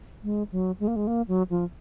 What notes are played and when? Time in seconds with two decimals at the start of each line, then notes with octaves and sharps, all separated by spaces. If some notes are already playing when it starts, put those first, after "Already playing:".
0.24 G#3
0.52 F#3
0.80 G#3
0.88 A#3
0.96 G#3
1.07 A#3
1.28 F#3
1.50 F3